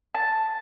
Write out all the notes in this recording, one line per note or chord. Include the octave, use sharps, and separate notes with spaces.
A5